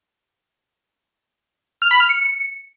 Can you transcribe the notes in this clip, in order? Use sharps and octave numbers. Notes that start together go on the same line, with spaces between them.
F6
B5
F6
C#7